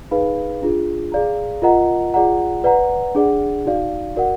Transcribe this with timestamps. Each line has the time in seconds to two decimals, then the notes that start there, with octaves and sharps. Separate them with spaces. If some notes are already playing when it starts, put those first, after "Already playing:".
0.11 D#4 G#4 B4 F5 B5
0.62 D4 F4 G#4
1.12 G#4 D5 F5 A#5
1.62 F4 A#4 D#5 F#5 A#5
2.14 F4 G#4 D5 F#5 A#5
2.64 B4 D5 F#5 A#5
3.15 D4 G#4 D5 F#5
3.66 D#4 F#4 D5 F5
4.16 F#4 A#4 D5 F#5